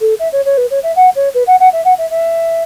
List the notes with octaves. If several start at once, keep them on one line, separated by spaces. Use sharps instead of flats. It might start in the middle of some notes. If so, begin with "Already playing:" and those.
A4
E5
C#5
C#5
B4
C#5
E5
F#5
C#5
B4
F#5
F#5
E5
F#5
E5
E5